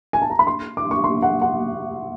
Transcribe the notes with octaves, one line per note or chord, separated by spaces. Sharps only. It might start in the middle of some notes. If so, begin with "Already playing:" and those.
G#5
A5
A#5
B5
C6
D6
C#6
C6
F#5
F#5